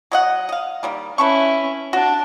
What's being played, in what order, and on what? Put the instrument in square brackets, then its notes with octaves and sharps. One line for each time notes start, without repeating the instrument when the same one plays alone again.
[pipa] F#3 D#5 F#5
D#5 F5
D#3 G3 A#3
[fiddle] C#4 E4 [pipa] B4 A5 C#6
[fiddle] D4 A5 [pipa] F#4